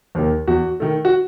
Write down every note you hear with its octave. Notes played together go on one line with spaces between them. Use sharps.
D#2 D#3
E2 F#4
D#3 A3
F#4